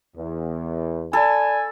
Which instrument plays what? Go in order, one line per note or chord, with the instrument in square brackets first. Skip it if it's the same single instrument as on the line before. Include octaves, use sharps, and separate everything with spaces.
[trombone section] E2
[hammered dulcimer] A4 [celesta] D5 B5 [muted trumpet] G#5